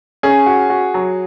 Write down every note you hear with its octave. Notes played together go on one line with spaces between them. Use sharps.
C#4 G#4
F#4
F#4
F#3